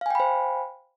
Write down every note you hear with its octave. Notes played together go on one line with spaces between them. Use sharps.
C5 F5 G5 G#5 B5